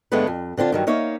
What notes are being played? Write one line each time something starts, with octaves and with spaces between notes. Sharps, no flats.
G2 D3 G#3 A3 B3 B4
F2
D3 C4 D4 F4
G2 D#3 F#3
A#3 D#4 C#5 E5 F5